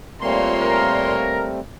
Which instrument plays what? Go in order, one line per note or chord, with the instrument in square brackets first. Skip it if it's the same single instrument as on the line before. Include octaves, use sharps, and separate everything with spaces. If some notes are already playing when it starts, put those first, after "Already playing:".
[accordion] A#2 C6 [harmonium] G3 A3 C4 [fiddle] A#3 C#5
[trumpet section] A#4